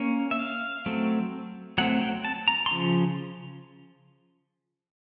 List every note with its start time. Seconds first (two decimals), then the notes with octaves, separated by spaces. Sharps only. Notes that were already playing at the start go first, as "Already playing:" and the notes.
Already playing: A#3 C#4
0.31 E5
0.39 F5
0.86 F#3 A3 C4
1.78 F#3 A3 C4 F#5
2.01 G5
2.25 A5
2.48 A#5
2.66 C6
2.71 C#3 F3